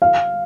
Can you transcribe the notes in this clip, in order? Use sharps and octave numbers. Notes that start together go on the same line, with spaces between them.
F5